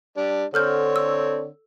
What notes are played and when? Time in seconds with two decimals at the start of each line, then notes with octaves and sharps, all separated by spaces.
0.17 G3 D4
0.54 D3 C4 A4 C#5 F6 G6
0.96 E6